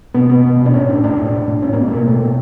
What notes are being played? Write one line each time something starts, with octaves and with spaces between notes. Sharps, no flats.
B2 B3
B2 B3
B2
B2
D4
A2 C#4
A2 D4
A2 D4
A2
A2
A2
A2 C#4
A#3
A2 B3
A3
B2 A#3
B2 A3
B2